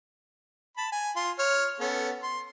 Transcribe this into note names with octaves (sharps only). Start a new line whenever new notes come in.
A5 B5
G#5
F4 C6
C#5 F6
B3 C#4 A4
C6